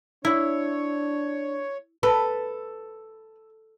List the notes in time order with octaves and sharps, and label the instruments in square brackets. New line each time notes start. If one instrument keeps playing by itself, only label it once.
[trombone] D4 [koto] E4 [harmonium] C#5
[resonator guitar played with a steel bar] A4 [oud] B4